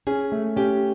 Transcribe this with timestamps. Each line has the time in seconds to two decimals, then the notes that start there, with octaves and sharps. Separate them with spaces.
0.07 C#4 G#4
0.32 A3
0.56 C#4 G4